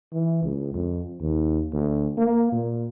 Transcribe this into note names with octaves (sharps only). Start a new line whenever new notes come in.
E3
C#2
F2
D#2
D2
A#3
A#2